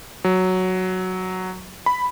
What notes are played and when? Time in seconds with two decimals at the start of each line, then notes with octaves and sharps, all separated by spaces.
0.24 F#3
1.86 B5